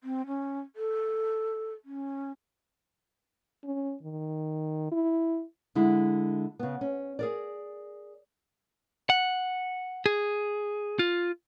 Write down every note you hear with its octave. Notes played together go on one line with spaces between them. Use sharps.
C4
C#4
A4
C#4
C#4
D#3
E4
D3 G#3 E4
C#3 B3
C#4
G#4 A#4 D5
F#5
G#4
F4